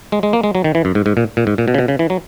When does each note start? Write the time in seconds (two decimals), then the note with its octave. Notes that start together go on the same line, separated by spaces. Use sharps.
0.12 G#3
0.23 G#3
0.33 A#3
0.44 G#3
0.55 F#3
0.64 D#3
0.75 E3
0.85 F#2
0.95 G#2
1.06 G#2
1.17 A#2
1.37 A#2
1.47 G#2
1.58 A#2
1.68 B2
1.74 C#3
1.78 B2
1.88 C#3
1.99 E3
2.10 F#3